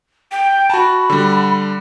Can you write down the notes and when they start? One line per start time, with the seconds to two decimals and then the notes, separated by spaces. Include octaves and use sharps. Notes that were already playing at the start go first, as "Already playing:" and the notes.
0.31 G5
0.70 F#4 A5 B5
1.10 D3 G3